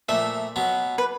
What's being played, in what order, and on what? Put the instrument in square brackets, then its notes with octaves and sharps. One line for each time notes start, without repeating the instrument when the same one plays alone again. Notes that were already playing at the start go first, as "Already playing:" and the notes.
[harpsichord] A#2 F3 A3 [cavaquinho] E5
[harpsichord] B2 F#3 B3
[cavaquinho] B4